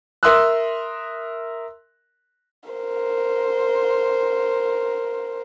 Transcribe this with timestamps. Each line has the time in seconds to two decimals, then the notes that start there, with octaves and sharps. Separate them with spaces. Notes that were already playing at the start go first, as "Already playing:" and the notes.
0.23 A#4 E5 C6 D#6 E6 F#6
2.70 A#4 C5